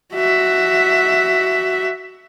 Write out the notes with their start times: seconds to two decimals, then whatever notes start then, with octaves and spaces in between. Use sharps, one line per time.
0.14 F#4 E5